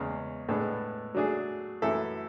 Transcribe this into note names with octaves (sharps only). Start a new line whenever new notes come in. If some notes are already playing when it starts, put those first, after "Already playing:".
Already playing: E2 C#3 G#3
A2 G#3 B3 D4 A4
F#3 A3 D4 G#4
F#2 E3 A3 E4 A4